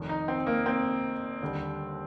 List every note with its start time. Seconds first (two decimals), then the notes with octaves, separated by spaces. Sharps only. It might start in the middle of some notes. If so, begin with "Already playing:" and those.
Already playing: F1 F2 D#3
0.09 D#4
0.28 C4
0.47 A#3
0.66 C4
1.42 D#2 D3 G3